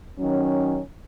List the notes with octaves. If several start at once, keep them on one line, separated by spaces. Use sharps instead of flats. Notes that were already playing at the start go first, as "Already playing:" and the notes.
D#3 F#3 C#4